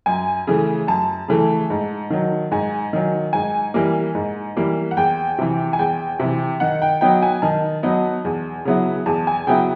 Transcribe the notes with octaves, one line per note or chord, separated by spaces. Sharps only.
F#2 G#5
C#3 E3 A3
F#2 A5
C#3 E3 A3
G#2
D#3 F#3
G#2 G#5
D#3 F#3
G#2 G#5
E3 G3 A#3
G#2
E3 G3 A#3
F#5
E2 G5
C3 E3
G#5
E2 G5
C3 E3
D#3 F#5
G5
F#3 B3 D#4 G5
G#5
D#3 A5
F#3 B3 D#4
E2
C#3 F#3 B3 E4
E2 A5
G#5
C#3 F#3 B3 E4 G5